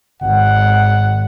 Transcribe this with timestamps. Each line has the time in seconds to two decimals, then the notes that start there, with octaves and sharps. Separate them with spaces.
0.22 G#1 F#5